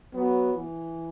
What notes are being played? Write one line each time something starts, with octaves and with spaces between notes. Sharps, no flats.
F#3 B3
E3